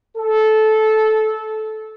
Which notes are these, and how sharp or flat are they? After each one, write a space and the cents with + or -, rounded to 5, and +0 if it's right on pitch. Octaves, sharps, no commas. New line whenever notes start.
A4 -15